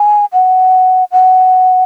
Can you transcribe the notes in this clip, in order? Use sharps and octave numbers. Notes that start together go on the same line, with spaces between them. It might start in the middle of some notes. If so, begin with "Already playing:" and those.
Already playing: G#5
F#5
F#5